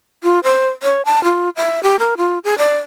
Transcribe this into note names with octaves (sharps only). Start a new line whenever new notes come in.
F4
C5
C#5
A5
F4
E5
G4
A#4
F4
G#4
D5